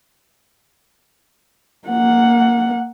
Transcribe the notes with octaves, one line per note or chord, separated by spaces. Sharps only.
A#3 F#5